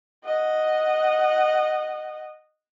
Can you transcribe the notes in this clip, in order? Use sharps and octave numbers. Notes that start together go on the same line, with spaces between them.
D#5 F#5